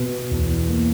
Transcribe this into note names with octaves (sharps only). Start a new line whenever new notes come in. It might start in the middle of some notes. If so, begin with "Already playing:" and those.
Already playing: B2
E2
A#3